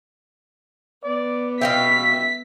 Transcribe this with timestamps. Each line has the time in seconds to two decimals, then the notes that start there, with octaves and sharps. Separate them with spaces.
1.04 B3 D5
1.61 B2 E5 F5 G5 B6